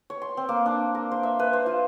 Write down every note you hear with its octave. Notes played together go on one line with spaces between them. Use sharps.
C#5
C6
C4
A#3
D4
A#4
C5
E5
B4
C5
F4